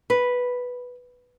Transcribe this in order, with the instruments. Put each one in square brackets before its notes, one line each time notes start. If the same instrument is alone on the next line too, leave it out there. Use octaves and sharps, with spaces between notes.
[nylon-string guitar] B4